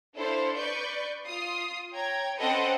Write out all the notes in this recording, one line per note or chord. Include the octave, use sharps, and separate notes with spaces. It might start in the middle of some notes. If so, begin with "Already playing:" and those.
D4 E4 A4 C5 F5
B4 D5 C#6 G6
F4 D#6 C7
C#5 G5 A#5 G#6
C4 C#4 A4 B4 D#5 F#5